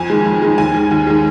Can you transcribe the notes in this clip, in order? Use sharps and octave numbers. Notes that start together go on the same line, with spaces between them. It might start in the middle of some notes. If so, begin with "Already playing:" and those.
Already playing: F2 G#5
D#3 G#3
F2
D#3 G#3
D#2 G#5
D#3 G#3
D#2
D#3 G#3